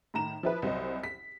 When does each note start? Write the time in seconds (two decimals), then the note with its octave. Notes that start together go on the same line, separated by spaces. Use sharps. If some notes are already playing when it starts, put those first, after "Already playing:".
0.14 A2 D#3 A#5 E7
0.43 F3 E4 B4
0.62 C2 F#3 C5 D#5
1.04 B6